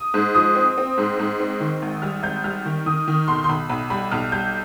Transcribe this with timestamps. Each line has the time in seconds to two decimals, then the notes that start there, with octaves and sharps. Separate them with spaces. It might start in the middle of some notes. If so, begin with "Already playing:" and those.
Already playing: D#6
0.14 G#2
0.35 F3 D#6
0.56 C4
0.78 C4
0.98 G#2
1.19 G#2
1.40 C4
1.60 D#3
1.82 G#1
2.02 G3 F6
2.23 G#1 G6
2.44 G3 F6
2.65 D#3
2.86 D#3 D#6
3.08 D#3
3.28 B1 C6
3.44 C6
3.49 B1 B5
3.69 B1 B5
3.90 G3 B5
4.11 B1 F6
4.32 G3 G6